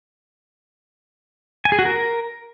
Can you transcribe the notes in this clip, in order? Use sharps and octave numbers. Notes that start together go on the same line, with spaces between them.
G#5
G#4
F#4
A#4